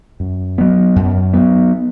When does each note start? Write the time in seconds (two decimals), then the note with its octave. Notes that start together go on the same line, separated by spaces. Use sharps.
0.20 F#2
0.58 F#3 B3
0.96 F#2
1.34 F#3 B3